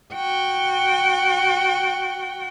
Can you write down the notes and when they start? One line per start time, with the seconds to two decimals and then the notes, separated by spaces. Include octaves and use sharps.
0.14 F#4 G5